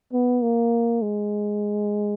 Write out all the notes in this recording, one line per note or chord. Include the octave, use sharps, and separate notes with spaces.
B3
A#3
G#3